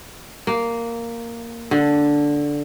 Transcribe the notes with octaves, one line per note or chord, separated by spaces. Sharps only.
A#3
D3